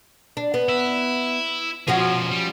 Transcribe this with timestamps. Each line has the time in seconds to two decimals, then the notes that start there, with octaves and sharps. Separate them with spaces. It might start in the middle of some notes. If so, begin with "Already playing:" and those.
0.37 D4
0.54 B3
0.69 E4
1.88 B2 F3 C#4 F#4 G#4
2.31 G3